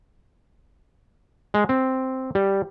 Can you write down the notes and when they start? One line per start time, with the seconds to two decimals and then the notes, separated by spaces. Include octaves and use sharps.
1.54 G#3
1.69 C4
2.35 G3